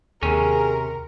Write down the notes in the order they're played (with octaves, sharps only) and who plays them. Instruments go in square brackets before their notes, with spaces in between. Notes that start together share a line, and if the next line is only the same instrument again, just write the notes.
[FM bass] D#2 [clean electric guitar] C3 C#4 [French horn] G#4 [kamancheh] A#4